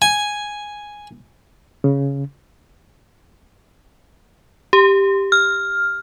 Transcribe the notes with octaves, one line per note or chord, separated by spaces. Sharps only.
G#5
C#3
G4
F6